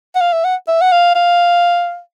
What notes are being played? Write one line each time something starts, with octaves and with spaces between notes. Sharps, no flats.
F#5
F5
E5
F#5
E5
F#5
F5
F5